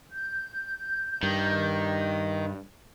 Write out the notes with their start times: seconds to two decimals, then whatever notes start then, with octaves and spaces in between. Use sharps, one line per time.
0.11 G6
1.23 G2 D#3